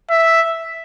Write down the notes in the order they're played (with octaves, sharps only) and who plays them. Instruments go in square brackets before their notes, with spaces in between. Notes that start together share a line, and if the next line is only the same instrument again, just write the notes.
[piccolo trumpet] E5